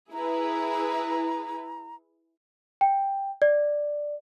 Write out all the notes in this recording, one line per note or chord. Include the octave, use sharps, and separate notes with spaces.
E4 G#4 B4 A#5
G5
D5